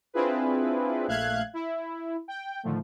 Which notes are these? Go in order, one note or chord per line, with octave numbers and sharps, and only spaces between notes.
C4 D4 E4 F4 G#4 B4
A#1 A3 E5 F5 F#6 G#6
E4
G5
A2 D3 D#3 F3 A3